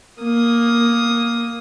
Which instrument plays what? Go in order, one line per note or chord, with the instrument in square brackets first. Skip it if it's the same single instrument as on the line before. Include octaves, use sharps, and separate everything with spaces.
[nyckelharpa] A#3 D#6